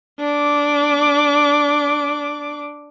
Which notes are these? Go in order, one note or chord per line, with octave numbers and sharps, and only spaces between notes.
D4 D6